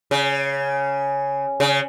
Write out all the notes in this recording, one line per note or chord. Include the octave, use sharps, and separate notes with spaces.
C#3
C#3